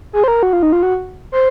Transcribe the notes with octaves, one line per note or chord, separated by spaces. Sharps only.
G#4
C5
A#4
F#4
F4
D#4
F4
F#4
C5